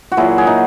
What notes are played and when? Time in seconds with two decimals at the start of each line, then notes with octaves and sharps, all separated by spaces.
0.12 F#4
0.17 A#2 F#3 E4 G#4
0.38 G#4
0.47 D#4 F#4